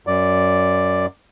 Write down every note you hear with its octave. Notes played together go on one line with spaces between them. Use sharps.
F#2 D5